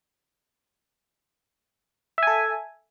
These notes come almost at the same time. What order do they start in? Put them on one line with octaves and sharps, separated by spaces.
E5 G#5 A4